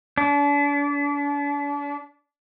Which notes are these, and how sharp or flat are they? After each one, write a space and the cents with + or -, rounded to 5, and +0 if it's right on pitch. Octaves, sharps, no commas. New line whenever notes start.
D4 -40